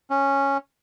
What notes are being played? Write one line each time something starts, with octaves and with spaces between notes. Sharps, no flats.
C#4